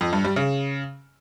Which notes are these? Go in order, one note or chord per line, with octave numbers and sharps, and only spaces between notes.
F2
G2
G3
C#3